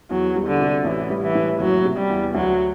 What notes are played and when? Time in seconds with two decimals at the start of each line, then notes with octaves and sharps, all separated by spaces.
0.10 E2 F#3
0.36 G3
0.47 D3
0.60 C3
0.85 A1 E3
1.10 G3
1.23 E3
1.35 A2
1.60 F#1 F#3
1.85 C3
1.98 G3
2.09 E2
2.35 D2 F#3